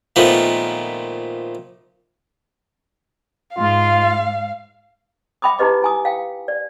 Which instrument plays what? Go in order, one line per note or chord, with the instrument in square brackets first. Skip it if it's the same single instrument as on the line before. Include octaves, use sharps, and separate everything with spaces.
[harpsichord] A#2 D#3 F3 A3 B3
[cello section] G#2 [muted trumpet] F4 [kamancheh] F5
[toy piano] E5 G5 B5 D6 D#6
D#4 E4 G4 B4 D#5 D6
E4 G#5 D#6
F5 G5
D5